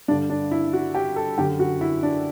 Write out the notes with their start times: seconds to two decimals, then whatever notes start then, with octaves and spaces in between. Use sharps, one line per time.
0.08 G2 D3 D4
0.30 D4
0.51 E4
0.73 F#4
0.95 G4
1.16 A4
1.37 F#2 D3 G4
1.60 F#4
1.81 E4
2.03 D4